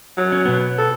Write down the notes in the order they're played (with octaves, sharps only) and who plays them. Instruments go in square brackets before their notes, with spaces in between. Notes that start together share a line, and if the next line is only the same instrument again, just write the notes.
[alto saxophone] F#3
[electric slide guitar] C#4
B2 B3
[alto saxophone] A4